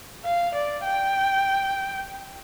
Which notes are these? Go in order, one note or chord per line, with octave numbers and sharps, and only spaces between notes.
F5
D5
G5